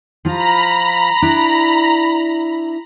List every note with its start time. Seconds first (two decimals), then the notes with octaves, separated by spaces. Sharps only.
0.25 F3 F4 A#5 B5
1.22 D4 E4